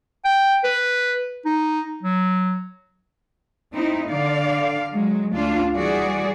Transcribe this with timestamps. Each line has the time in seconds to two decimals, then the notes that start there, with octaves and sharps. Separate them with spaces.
0.25 G5
0.64 B4
1.45 D#4
2.03 F#3
3.74 C4 D#4 E4
4.07 D3 D5 F5
4.91 F#3 G#3
5.32 D2 D4 F4 F5
5.74 E3 G3 F#4 G#4 D5